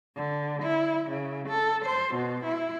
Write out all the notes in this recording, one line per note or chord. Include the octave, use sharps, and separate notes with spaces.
D3
E4
C#3
A4
C5
B2
E4